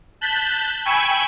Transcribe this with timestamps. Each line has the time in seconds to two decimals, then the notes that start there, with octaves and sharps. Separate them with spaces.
0.21 A5 F#6 G6 B6
0.85 G5 G#5 B5 C#6 E6 G#6